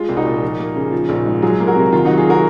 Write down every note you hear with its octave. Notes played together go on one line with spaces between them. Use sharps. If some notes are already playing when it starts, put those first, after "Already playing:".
Already playing: G#3 F4
C2
D#4 F#4
A#2
F3
A#3
C#3
F3
A#1
G#2
F#3 F4 G#4
A#3
F#4 A#4
C3
D#3 F4
F#3 D#4 F#4
F4 G#4
C3 F#4 A#4